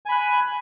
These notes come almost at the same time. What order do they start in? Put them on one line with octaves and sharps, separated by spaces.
G#5 B5 F#6